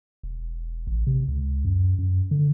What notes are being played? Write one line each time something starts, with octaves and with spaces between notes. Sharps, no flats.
E1
A1
C3
C#2
F#2
F#2
D3